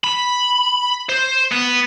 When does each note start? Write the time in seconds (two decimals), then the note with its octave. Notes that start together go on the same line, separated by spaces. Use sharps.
0.04 B5
1.09 C5
1.52 B3